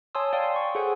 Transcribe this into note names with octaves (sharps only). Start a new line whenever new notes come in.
C#5 G#5 A5 C6 D#6 E6
D5 F5 G5 G#5 C6
C#6
G#4 A4 C5 F#5 G#5